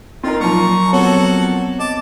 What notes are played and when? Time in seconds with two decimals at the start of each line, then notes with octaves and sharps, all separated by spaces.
0.23 C4 D#4 F4 A#4
0.40 A#2 F3 F#3 A#5 C#6
0.93 B3 C4 F#4 A4 C#5
1.80 D#5 A5 D6